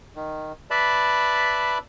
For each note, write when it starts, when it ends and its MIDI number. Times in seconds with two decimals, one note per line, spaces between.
0.16 0.52 51
0.71 1.78 71
0.71 1.78 74
0.71 1.78 76
0.71 1.78 81
0.71 1.78 83